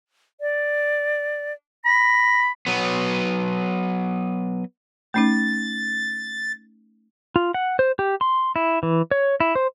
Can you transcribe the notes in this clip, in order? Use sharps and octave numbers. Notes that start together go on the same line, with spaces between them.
D5
B5 A#6
F#3 B3
A3 C#4 D#4 A6
F4
F#5
C5
G4
C6
E4
E3
C#5
E4
C5